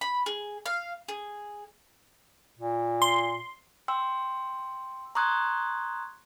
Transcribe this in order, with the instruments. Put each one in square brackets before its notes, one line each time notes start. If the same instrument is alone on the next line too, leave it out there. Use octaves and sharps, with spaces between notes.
[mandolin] B5
G#4
F5
G#4
[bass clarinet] A#2
[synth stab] C6
[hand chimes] G5 C6 E6
A#5 C6 C#6 D#6 F#6 G#6